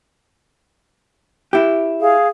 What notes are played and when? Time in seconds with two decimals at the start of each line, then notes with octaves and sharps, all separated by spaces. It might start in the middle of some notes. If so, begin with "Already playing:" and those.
1.53 E4 G4
2.02 G#4 F5